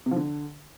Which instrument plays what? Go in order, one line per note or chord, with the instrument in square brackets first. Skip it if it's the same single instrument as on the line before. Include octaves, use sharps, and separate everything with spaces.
[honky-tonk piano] C3
F3
D3